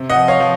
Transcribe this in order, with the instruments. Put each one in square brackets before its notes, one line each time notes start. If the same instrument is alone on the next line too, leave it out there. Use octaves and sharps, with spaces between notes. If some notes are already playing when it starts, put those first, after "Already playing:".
Already playing: [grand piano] C3
D#5 F#5
F3
C#5 F5
F3